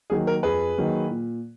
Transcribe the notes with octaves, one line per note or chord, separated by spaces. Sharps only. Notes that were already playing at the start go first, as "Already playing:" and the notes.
D#3 F#3 A#3 G#4
A#4
F2 G#4 B4
D#3 F#3 A#3
A#2